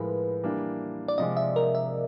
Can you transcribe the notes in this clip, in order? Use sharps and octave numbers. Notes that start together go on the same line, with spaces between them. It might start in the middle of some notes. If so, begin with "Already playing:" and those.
Already playing: A2 F3 G#3 A#4 B4
E3 G3 A#3 D4
D5
C3 F3 G#3 D#5
E5
A#4
E5